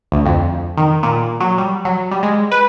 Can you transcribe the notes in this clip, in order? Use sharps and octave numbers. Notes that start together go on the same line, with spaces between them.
D2
F2
D#3
A#2
F#3
G3
F#3
G3
G#3
B4